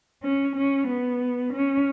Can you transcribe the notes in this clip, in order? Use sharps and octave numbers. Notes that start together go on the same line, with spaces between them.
C#4
C#4
B3
C#4